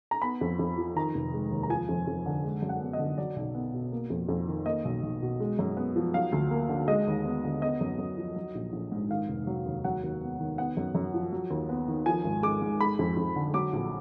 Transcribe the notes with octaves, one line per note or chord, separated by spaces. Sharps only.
A#5
B3 B5
F2
F2
F3
D#3 A#5
F1
G#3
D#2
A#5
F3 G#5
F2
F2
D3
G#3
F#2
F#5
B3
D#5
D3
F#3 D5
B1
B3
B2
A#3
F2
F2
D#3
A#3 D#5
B1
B1
B2
G#3
F#2
B3
F3
F#3 F5
D2
A#3
D3
G#3 D#5
D#2
B3
D3
B3 D#5
F#2
F#2
F3
F#3
A#1
A#1
G#2
D#3 F5
F1
F#3
D#2
F#3 F#5
D#2
B3
D#3
B3 F#5
F#2
F#2
F3
F#3
D#2
B3
D#3
F3 G#5
G#1
G#3 D6
G#2
G#3 B5
F2
F2
D3
F#3 D6
A#1